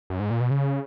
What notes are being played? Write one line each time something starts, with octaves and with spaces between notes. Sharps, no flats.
F#2
G#2
A#2
B2
C#3